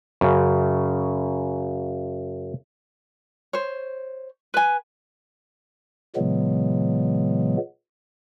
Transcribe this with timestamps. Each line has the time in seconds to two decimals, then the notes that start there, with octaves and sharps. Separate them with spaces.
0.21 F#2 C#3
3.53 C5 C#5
4.54 B4 G#5
6.16 A#2 C#3 E3 F#3 G#3 B3